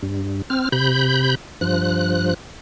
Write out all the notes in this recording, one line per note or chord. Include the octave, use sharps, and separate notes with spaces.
G2
C4 F6
C3 B5 G6
G2 F3 F#6